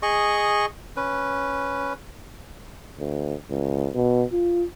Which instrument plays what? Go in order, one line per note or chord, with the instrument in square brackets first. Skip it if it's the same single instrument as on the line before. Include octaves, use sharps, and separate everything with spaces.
[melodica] G#4 D#5 C#6
C#4 B4
[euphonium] D2
C#2
B2
F4